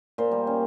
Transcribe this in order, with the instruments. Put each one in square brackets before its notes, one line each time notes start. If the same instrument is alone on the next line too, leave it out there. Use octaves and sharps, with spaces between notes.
[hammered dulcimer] A#2 C5
G3
C#4